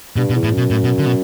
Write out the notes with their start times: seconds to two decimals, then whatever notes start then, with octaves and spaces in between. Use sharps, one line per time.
0.16 G2 B2
0.30 B2
0.35 E2
0.43 A2
0.53 F#2 B2
0.70 A2
0.84 B2
0.98 D3
1.06 B2